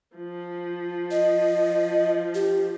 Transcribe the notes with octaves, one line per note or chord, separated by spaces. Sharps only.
F3
D#5
G4